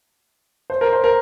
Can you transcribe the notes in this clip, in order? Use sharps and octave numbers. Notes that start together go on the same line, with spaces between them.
C5
A#4
C5
A#4